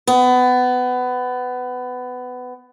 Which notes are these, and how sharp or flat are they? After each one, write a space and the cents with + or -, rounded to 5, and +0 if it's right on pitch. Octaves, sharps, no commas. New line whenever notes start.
B3 +20